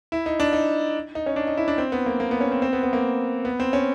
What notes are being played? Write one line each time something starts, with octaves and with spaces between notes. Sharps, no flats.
E4
D#4
D4
D#4
D#4
C#4
D4
D#4
E4
D4
C4
B3
A#3
A#3
B3
C#4
C4
C4
B3
B3
A#3
B3
C4
C#4